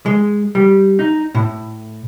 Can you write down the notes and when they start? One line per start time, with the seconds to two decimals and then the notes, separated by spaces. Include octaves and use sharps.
0.06 G#3
0.55 G3
0.99 D#4
1.35 A2